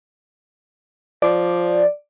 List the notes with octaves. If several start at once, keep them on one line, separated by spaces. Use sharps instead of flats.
F3 D5